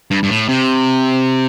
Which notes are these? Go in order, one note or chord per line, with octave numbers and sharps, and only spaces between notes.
G2
G2
A2
C3